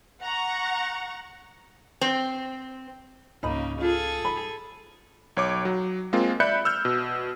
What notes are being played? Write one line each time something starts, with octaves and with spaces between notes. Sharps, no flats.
F#5 A#5 C#6
C4
C#2 G#2 C#3 A#3 D#4 D#5 B5
F4 G#4 A4
G3 D#4 B5
B1 C#5 D6
F#3
G#3 A#3 C4 F4
D5 E5 B5 F#6 G6 C#7
E6 F6 G6
B2